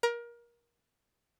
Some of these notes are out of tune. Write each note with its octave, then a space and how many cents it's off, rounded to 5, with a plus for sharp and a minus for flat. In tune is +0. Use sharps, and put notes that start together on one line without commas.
A#4 +25